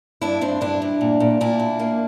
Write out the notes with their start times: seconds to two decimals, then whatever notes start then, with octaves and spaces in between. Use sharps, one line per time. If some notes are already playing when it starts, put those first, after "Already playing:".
0.21 G2 D4 E4
0.41 G2 C4 D4
0.61 G2 D4 E4
0.82 G2
1.01 A#2
1.20 A#2
1.41 A#2 D4 E4
1.60 A#2
1.79 A#3